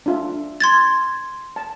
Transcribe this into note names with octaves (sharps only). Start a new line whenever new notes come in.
D4 F4 E5
C6 G#6 A6
A5